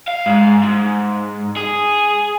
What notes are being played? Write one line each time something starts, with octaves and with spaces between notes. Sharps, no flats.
F5
G#2
G#2
G#4